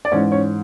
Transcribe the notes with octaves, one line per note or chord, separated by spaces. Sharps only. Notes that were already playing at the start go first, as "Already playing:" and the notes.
D5
G#2 E3 G#3 C#4 C#5
C#4 C#5